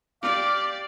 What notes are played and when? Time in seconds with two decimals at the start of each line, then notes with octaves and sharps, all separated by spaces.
0.23 G4 D5 F5 D6